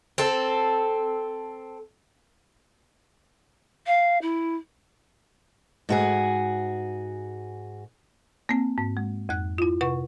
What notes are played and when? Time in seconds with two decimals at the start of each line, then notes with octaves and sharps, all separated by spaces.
0.18 C4 A4
3.86 F5
4.21 E4
5.89 G#2 F#4 G#4
8.49 A#3 C4
8.78 G#2
8.97 G#3
9.29 F2 F#6
9.58 E4 F4
9.81 C3 B4 F#5 C#6